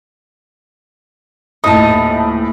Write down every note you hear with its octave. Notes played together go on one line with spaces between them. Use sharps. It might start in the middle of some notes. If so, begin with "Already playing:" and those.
D#1 A2 D#4 A5 D#6